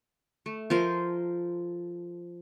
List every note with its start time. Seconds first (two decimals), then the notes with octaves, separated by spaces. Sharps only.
0.46 A3
0.70 F3 A4 A#4 C5